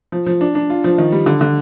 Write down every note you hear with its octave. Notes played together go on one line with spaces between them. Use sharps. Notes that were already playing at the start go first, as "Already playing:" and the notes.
F3
F3
D4
D4
F4
F3
D#3
G3
D3
D3